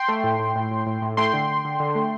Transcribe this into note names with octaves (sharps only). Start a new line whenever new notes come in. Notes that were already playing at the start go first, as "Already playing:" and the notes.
Already playing: G5 C6
A3
A2
A2
A2
A2
A2
A2
A3 G5 C6
D3
D3
D3
D3
A3